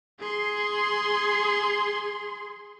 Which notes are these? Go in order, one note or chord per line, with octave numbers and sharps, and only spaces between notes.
G#4 C6